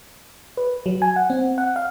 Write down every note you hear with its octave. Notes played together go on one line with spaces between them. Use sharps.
B4
F#3
G#5
F#5
C4
F#5
F5